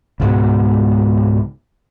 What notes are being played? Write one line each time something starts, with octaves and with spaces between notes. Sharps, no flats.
C#2 G#2 B2